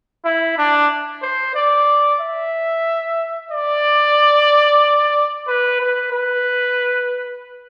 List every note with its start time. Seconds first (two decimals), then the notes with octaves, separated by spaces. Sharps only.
0.24 E4
0.58 D4
1.22 C5
1.55 D5
2.21 E5
3.51 D5
5.47 B4
5.80 B4
6.12 B4